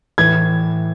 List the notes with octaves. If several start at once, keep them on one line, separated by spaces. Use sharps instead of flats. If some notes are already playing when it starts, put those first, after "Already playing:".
A2 E3 G#6